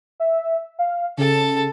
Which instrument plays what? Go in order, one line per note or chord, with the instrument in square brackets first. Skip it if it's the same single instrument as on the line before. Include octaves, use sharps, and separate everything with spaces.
[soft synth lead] E5
F5
[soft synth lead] C#3 [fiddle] A4 A5